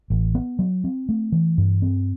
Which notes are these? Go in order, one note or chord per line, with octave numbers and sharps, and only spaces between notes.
A1
B3
F#3
C4
A3
E3
G2
C4